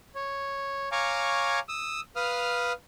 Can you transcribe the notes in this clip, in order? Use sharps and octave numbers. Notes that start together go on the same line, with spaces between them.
C#5
C#5 F5 G#5 A#5 C#6 D6
D#6 E6
B4 F5 D#6 F6